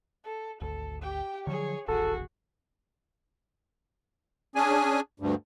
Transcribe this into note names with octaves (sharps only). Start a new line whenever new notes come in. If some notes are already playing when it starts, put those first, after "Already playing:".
A4
G#1 D2 A4
G4 G5
D3 F3 F#3 G#4 C#5
D#1 A1 D#2 F#4 G#4 A4
C#4 D4 G#4 G#5
D2 G2